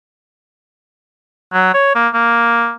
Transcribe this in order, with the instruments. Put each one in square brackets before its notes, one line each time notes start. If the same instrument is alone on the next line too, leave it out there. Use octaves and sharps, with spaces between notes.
[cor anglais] F#3
C#5
A#3
A#3